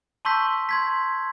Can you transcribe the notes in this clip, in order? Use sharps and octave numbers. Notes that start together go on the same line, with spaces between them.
A5 C6 C#6 E6 G6 B6
C6 G#6 B6